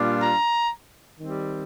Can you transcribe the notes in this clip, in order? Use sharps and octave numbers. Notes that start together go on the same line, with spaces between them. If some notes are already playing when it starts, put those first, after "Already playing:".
Already playing: A#2 G3 D4 F4
A#5
D#3 G3 C4